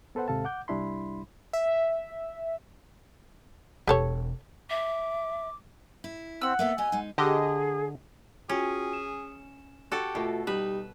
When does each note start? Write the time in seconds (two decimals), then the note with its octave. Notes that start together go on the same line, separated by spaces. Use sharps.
0.15 B3 A4 B4 C5 F#5
0.28 D#2 G#2 C3 A4 F5 A5
0.45 F#5 D6 G6
0.68 C2 G3 D4 E4 B5 C6
1.53 E5
3.88 E1 G4 A4 C#5
4.70 E5 D6
6.04 E4
6.41 C4 F#5 E6
6.59 A#3 B3 A4 E5
6.78 G4 D#5 G#5
6.92 G#3 D#4
7.18 D3 G4 G#4 D#5
8.49 C#4 F4 F#4 G#4 G5
8.93 E7
9.92 F#4 G4 A4
10.15 B2 A3 F4 F#4
10.47 G3 D#4 B4 E7